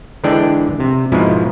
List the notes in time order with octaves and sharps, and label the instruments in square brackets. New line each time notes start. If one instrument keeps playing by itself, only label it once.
[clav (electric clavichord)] D3 E3 G#3 D4 D5 G5
C3
G#2 B2 F3 G#3 E4